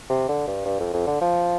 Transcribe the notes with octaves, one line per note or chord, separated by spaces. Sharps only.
C3
D3
G2
G2
F2
F2
D3
F3